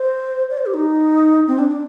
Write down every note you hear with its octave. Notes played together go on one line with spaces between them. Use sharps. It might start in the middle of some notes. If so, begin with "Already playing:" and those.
Already playing: C5
D5
C5
G4
D#4
C4
D4
D4